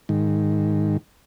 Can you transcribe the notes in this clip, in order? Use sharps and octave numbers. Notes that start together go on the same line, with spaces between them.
G#2 D#3